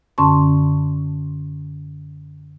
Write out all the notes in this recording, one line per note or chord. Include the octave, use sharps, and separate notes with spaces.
F#2 D3 C#4 A5 C6 C#6